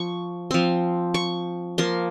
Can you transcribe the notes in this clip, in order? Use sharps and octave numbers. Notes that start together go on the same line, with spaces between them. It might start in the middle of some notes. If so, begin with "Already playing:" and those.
Already playing: F3 C#6
F3 C4 C6
C#6
F3 A#3 C6